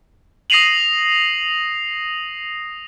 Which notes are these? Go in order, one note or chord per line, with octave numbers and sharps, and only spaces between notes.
D#6 A#6 C7 D#7 F7 F#7